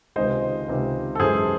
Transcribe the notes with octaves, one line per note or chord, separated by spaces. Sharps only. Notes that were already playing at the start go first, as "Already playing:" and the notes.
C#2 C3 D#3 G#3 C5 D#5
C#2 C3 D#3 G#3
A4
F#2 E3 G#3 G#4 C5